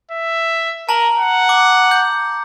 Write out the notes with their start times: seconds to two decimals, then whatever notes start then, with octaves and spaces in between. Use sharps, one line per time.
0.11 E5
0.89 A#4 A5 A#5 F#7
1.19 F#5
1.49 D6
1.91 G6